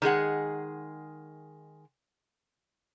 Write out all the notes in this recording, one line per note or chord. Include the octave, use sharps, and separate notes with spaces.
D#3 G#3 G#4 F#5